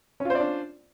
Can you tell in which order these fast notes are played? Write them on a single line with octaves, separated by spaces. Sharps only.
C#4 F4 C5 D5 D4